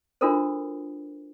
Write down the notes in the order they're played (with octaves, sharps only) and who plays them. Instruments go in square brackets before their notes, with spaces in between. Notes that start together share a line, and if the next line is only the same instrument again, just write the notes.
[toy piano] D4 F4 F#4 A4 A#4 C5